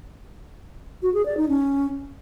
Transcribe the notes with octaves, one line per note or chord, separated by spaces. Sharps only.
F#4
G#4
D5
D#4
C#4